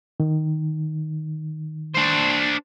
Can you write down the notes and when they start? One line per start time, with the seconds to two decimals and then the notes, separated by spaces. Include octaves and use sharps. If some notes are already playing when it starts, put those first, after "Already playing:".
0.20 D#3
1.94 D4 C5